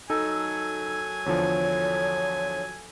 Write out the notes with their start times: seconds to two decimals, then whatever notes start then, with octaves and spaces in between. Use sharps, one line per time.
0.10 F#3 D#4 A4 G#5
1.26 E2 D3 F3 C#5